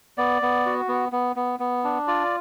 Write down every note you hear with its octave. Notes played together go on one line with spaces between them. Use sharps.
B3 D5
B3
F#4
B3
B3
B3
B3
D4
F4 D5